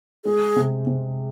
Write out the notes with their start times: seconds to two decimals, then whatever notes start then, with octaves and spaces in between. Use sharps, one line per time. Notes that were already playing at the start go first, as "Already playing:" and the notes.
0.24 G#3 G#4
0.56 C3
0.87 C3